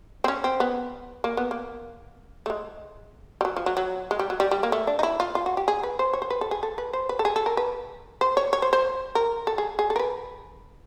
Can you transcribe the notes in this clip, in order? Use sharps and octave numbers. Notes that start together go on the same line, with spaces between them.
C4
C#4
C4
B3
A#3
B3
A#3
A3
G#3
G3
F#3
F3
F#3
F#3
G#3
G3
F#3
G3
G3
A#3
A3
D4
D#4
E4
F4
F4
F#4
G4
G#4
B4
C5
C#5
C5
B4
A4
G#4
A4
B4
C5
B4
A4
G#4
A4
A#4
B4
C5
C#5
C#5
C5
C5
A#4
A4
G#4
G#4
A4
A#4
B4